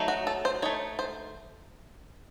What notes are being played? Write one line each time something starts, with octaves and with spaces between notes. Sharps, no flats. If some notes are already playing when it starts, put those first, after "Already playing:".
Already playing: F#3 A3 D#4
F#4
A4
C5
A3 D#4 C#5
C5